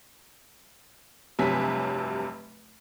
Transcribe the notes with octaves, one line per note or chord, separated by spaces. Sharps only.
F1 G2 C3 F#3 G#5 B6